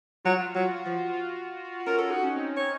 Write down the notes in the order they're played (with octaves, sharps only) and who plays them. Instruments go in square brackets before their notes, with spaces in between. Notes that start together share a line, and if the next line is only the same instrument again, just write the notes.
[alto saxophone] F#3 [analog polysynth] F4
[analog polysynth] F#4
F4
F#4
[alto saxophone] F#3 [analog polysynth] F4
[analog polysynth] F#4
F4
F#4
[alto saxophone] F3 [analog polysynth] F4
[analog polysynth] F#4
F4
F#4
F4
F#4
F4
F#4
F4
F#4
F4
F#4
F4
F#4
[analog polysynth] C#4 F4 [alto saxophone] A#4
[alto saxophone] A4
[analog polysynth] D#4 [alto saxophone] F#4
[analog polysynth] C#4
C4 D#4
[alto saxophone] C#5